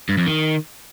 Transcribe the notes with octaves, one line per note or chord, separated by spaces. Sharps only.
G2
F2
D#3